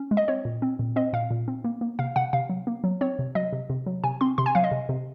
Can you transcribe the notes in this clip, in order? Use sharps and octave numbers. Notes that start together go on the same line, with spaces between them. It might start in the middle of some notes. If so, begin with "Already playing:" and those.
Already playing: C#4
G#3
D#5
C4 C#5
A#2
C4
A#2
C4 D#5
A#2 F5
A#2
C4
A#3
A#3
C3 F5
C3 F#5
C3 F5
F#3
A#3
F#3
C4 C#5
C3
F#3 D#5
C3
C3
F#3
C3 G#5
C4 C6
C3 C6
G#5
F#3 F5
D#5
C3
C3